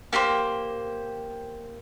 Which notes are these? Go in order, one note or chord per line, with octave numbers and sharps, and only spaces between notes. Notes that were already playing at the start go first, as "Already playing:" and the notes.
A#3 G4 A4 C5